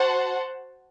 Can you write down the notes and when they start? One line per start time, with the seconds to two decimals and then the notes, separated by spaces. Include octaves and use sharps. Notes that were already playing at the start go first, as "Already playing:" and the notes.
Already playing: F#4 C5 F#5 A5